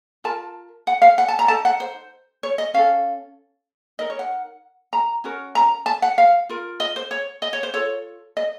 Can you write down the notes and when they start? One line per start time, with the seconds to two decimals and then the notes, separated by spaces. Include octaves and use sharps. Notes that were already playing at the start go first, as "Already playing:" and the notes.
0.24 F4 A#4 A5
0.87 F#5
1.02 F5
1.18 F#5
1.28 A5
1.39 A#5
1.48 D#4 A4 A5
1.65 F#5
1.80 C5
2.43 C#5
2.58 D#5
2.74 C#4 A4 F5
3.99 D#4 A#4 D#5
4.10 C#5
4.19 F#5
4.93 A#5
5.24 C#4 F#4 A#4
5.55 A#5
5.86 A5
6.02 F#5
6.18 F5
6.49 F4 A#4
6.80 D#5
6.96 C5
7.11 C#5
7.42 D#5
7.53 C#5
7.63 C5
7.74 F4 A4 C#5
8.37 D#5